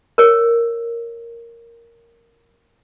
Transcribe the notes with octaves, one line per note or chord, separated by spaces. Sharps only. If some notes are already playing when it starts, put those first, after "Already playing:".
A#4 C#5